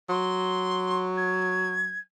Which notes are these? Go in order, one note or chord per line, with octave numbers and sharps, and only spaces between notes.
F#3 C6
G#6